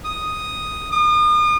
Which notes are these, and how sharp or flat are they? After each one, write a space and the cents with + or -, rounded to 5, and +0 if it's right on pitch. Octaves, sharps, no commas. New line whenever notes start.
D#6 +0
D#6 -40